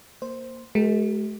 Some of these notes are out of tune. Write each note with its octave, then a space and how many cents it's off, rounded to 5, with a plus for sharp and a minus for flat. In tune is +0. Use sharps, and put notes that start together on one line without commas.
A#3 +0 C5 +0
G#3 +40 G4 -35 A#4 +0